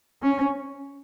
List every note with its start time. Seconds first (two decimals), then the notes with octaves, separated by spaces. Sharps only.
0.22 C#4